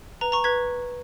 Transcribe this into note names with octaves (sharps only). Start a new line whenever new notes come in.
B4 A#5
A#5 C#6
B4 G#6 B6